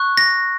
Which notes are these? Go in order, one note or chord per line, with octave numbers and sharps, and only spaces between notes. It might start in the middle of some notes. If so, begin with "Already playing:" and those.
Already playing: C#6 F#6
A#6